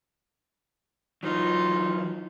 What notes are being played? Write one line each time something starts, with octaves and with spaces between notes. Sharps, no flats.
E3 F#3 D#4 F4